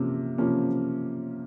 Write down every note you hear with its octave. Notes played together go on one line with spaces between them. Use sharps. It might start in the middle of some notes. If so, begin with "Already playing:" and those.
Already playing: C3 F3 A#3 C#4
C3 F3 A#3 C#4